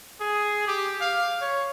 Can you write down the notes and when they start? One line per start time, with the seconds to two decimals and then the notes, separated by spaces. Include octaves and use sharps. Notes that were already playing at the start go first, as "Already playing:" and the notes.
0.20 G#4
0.67 G4
1.01 F5
1.41 C#5